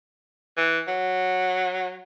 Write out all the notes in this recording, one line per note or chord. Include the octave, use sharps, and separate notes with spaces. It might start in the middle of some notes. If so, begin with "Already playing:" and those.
E3
F#3